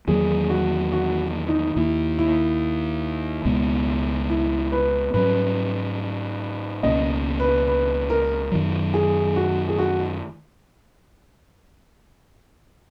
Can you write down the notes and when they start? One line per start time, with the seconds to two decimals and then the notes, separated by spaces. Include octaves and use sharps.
0.08 E2 D#3 F#3 A#3 G#4
0.50 F#4
0.92 F#4
1.48 D#4
1.76 D#2 D#3 A#3 E4
2.19 E4
3.45 C#2 B2 G#3 B3
4.29 E4
4.72 B4
5.14 G#2 F#3 C#4 B4
6.83 C#2 B2 A#3 C#4 D#5
7.40 B4
7.67 B4
8.10 A#4
8.52 F#2 D#3 F#3
8.94 G#4
9.36 F#4
9.69 G#4
9.78 F#4